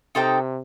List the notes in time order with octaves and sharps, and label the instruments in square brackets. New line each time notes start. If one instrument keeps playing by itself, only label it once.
[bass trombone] C3 [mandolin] D#4 A4 C5 G5